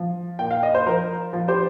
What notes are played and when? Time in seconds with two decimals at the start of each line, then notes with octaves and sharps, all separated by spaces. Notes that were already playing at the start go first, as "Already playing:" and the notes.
Already playing: F3
0.39 A#2 G5
0.51 F5
0.63 D#5
0.75 C5
0.86 F3 A#4
1.33 F3
1.48 G4 C5